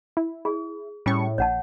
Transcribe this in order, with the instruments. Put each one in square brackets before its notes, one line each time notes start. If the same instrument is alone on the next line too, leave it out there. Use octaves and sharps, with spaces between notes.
[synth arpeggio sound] E4
[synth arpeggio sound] E4 [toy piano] G#4
[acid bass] A2 [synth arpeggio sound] G3 C#4 C#6
[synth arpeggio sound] A#1 [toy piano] C#5 F#5 A5